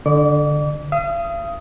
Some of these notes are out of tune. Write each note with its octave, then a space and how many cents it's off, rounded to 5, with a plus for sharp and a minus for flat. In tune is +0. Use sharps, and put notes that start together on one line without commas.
D3 +0 D5 +40 D6 -35
F5 -45 D#6 +10